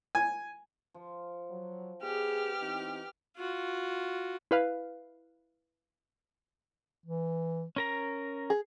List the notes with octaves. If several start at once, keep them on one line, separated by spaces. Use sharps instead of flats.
G#5
F3
F#3
B3 G4 G#4 D5 D#5 F6
E3 C4 D#4
F4 F#4
E4 B4 F5
E3
C#4 A#4 A#5
G#4